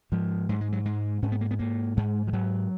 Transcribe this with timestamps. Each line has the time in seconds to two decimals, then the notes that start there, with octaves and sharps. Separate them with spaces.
0.12 G#2 F3
0.49 G#2 F#3
0.61 G#3
0.72 F#3
0.85 G#2 G#3
1.22 G#2 C#4
1.32 B3
1.41 A#3
1.51 B3
1.59 G#2 A#3
1.97 G#2 G#3
2.27 F3
2.33 G#2 F#3